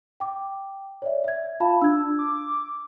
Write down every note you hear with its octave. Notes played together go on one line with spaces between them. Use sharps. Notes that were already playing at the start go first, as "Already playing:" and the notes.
G5 D6
C#5 D5 E5
E5 G#6
F4 F5 A5 B5
D4 E6 G#6
D6